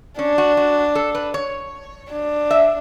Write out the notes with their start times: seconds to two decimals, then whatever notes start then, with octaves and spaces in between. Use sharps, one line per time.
0.19 C#4 D4
0.38 F#4
0.57 F#4
0.95 A4
1.15 B4
1.34 C#5
2.12 D4
2.51 E5